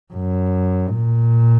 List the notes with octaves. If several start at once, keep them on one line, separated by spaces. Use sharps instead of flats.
F#2
A#2